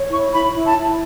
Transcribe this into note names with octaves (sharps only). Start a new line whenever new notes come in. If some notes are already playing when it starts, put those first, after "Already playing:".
Already playing: C#5
E4 C#6
E4 B5
E4
A5
E4